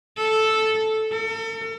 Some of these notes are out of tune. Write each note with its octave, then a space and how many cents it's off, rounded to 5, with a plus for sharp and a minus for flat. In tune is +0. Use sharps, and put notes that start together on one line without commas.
A4 -5
A4 +45